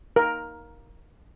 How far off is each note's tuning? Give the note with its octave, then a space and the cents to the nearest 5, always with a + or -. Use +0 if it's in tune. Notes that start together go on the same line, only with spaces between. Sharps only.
A#4 +10